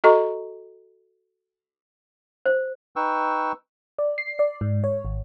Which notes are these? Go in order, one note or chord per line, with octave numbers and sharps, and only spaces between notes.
F#4 A4 D#5 A#5 C#6
C5
D#4 B4 G5 C#6 E6
D5
C7
D5
G#2
C#5
G#1